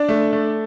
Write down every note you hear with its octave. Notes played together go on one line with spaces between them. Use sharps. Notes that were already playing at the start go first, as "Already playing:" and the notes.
Already playing: D4 D5
A3
A3